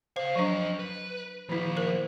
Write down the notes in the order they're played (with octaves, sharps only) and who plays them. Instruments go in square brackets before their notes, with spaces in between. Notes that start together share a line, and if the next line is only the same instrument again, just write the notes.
[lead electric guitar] C#3 F5 [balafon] C5
[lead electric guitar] F3 D#5 [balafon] F#3 D4
[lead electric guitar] B4
[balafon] D#3 E4 [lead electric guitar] F3 A#3
[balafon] A#4 C5